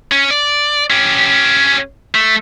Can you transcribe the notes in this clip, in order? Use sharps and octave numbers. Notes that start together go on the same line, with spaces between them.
C#4
D5
C#4 G4
A3